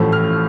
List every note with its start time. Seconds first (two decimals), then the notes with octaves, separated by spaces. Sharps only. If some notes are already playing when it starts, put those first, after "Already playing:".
Already playing: A1 A2 F3 A3
0.12 F6